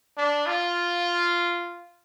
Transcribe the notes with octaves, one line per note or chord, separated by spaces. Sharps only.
D4
F4